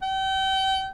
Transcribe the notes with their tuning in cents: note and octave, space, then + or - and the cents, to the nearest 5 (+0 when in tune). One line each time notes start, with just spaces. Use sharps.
G5 -35